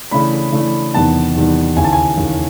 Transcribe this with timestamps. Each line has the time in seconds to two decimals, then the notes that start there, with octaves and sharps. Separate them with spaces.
0.11 C#3 E3 A3 D4 B5
0.52 C#3 E3 A3 D4
0.94 E2 C3 D#3 G3 B3 A5
1.35 E2 C3 D#3 G3 B3
1.76 D#2 C#3 E3 G#5
1.84 A5
1.93 G#5
2.18 D#2 C#3 E3